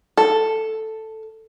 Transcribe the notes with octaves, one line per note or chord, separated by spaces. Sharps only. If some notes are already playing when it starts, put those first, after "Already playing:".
A4